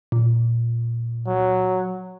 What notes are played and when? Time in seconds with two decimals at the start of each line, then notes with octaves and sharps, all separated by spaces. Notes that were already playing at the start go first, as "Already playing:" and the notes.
0.12 A#2
1.27 F#3